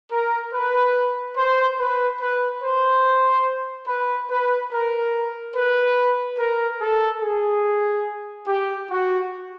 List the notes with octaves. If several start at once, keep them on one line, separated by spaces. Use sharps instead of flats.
A#4
B4
C5
B4
B4
C5
B4
B4
A#4
B4
A#4
A4
G#4
G4
F#4